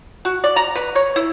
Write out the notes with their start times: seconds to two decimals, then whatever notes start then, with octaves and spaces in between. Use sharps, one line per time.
0.25 F#4
0.44 D5
0.56 A#5
0.75 B4
0.95 C#5
1.16 E4